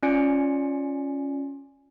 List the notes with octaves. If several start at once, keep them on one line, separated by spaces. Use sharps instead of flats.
C#4 F4 D5 G#5 C#7 D7